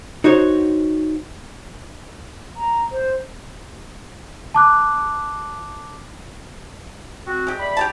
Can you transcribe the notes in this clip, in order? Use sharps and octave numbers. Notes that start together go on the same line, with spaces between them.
D#4 F#4 C5 C#5
A#5
C5
A5 D6 F#6
C4 F#4
G#3 G4
D5 E5 B5
G4 G#4 A5